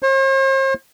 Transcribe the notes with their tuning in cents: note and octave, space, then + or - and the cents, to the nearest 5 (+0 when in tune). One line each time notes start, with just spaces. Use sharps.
C5 +45